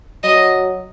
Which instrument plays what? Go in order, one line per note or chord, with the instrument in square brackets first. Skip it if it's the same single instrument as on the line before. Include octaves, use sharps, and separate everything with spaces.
[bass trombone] F#3 [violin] D#5